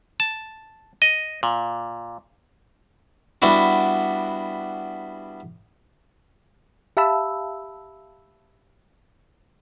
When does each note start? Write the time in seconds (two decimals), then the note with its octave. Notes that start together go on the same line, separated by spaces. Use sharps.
0.20 A5
1.02 D#5
1.43 A#2
3.42 G3 B3 D4 E4 F#4
6.97 G4 E5 F5 A5 B5 E6